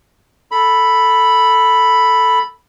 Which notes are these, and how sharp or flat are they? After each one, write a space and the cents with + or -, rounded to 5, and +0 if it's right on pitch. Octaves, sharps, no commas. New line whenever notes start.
A4 +0 B5 +0